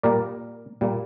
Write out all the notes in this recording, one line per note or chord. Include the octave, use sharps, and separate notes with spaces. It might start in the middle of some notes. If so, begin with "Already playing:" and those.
A#2 G3 A#3 A#4 D5
A#2 G3 A#3